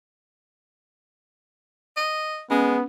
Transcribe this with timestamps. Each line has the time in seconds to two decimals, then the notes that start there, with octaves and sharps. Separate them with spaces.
1.97 D#5
2.51 G#3 B3 C#4